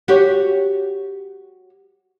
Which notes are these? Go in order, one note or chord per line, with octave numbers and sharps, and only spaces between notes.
F#4 G4 C#5